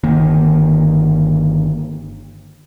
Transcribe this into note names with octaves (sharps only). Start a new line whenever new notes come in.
G1 D#3 A#3